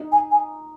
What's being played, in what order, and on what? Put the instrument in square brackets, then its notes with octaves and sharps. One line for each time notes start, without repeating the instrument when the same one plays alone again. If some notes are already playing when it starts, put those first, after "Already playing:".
Already playing: [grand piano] D#4
[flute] G#5
G#5